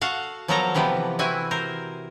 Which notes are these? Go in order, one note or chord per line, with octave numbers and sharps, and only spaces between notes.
F#4 A4 F5 F#5
F3 F#3 B3 A4 A#4 A#5
C3 E3 F3 G3 B3
E3 C4 E4 F#4 G#5
A#4 C5